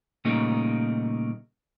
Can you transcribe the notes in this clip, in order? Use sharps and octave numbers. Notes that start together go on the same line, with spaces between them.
A#2 C#3 G3 A3 A#3 D#4